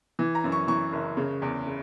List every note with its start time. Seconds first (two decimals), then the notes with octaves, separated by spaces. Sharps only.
0.19 E3
0.35 A#5
0.44 F#2
0.52 C#6
0.68 E3 C#6
0.92 F#1
1.17 C#3
1.42 E2
1.66 C#3